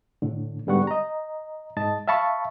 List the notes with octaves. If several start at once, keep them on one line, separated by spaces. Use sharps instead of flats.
A2 D3
G#2 D3 G3 B3 F#5 C#6
D#5 A#5
G#2 D#5 A5 A6
E5 F5 A5 B5 C#6